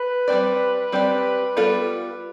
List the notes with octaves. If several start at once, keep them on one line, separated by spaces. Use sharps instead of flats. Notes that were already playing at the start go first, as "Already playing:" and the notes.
Already playing: B4
G3 C4 G4 D5
G3 C4 G4 D5
G3 B3 F4 A4